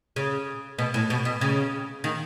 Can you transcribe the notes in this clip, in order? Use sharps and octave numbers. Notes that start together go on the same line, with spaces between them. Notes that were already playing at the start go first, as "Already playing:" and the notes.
C#3
B2
A2
B2
B2
C#3
D#3